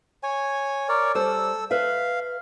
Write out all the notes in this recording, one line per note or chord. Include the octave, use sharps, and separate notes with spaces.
C#5 G#5
A#4 C#5 D5
G3 A4 C5 E6
B4 E5 F5